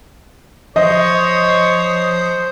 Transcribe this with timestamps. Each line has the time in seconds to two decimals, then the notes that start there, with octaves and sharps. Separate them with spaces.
0.76 F3 C5 C#5 D#5 D#6 C7